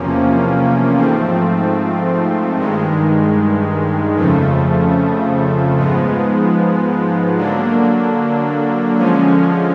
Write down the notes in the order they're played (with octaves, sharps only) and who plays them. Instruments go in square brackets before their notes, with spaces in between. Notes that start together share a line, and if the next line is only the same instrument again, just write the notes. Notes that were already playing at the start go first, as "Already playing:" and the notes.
Already playing: [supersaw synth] E2 C3 F3 A#3 C#4
G#2 F3 A3 C4
G2 D#3 G#3
F2 C#3 F3 A3
G#2 F3 G#3 B3
D3 F#3 A#3 D4
D3 F3 G#3 C#4